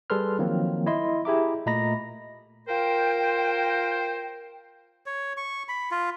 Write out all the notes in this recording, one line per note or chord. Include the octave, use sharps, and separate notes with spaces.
G3 G#4 A4 B4 C6 F6
D#3 F3 F#3 A#3 C4
E4 D#5 C6
E4 G4 G#4 E5 A#5 D6
A#2 A3 D#5 A#5 B5 A#6
F4 A#4 C5 G5
C#5
C#6
B5
F4